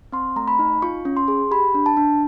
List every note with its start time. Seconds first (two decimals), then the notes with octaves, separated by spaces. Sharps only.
0.12 C4 C6
0.36 A3 A#5
0.48 B5
0.59 D#4
0.82 F4 C#6
1.05 C#4
1.17 C6
1.28 G#4
1.51 G4 B5
1.75 D4
1.86 A5
1.97 D4